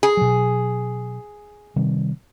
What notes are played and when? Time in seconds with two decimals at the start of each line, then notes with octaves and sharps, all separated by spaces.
0.03 G#4
0.17 B2 F#3
1.76 C3 D#3 G3